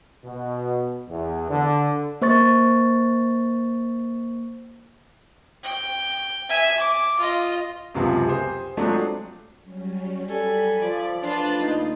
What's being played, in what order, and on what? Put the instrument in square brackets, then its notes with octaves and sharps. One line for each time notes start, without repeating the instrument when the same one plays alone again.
[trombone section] B2
E2
D3
[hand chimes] A#3 C5 C#6 A6
[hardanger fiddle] G5
E5 G#5
D6
F4 D#5
[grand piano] C#2 F#2 C3 F3 B3 C4
G4 G#4 C5
F3 F#3 G#3 A3 C4 D4
[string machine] F#3 G3 C#4
[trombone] G3 [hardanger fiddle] A4 G#5 [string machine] B5
[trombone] F3 [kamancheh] D5
[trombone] F3 [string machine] A3 [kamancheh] D4 B4 [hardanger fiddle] F4 A5
[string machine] D#2 A#3 D#6 [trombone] D#4